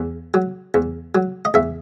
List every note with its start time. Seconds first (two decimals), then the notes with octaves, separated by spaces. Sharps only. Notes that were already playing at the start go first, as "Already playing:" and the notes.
Already playing: E2
0.34 F#3
0.74 E2
1.15 F#3
1.45 D#5
1.54 E2 E5